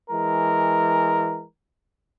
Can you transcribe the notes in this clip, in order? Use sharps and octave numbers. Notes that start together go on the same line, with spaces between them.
E3 G#3 A#4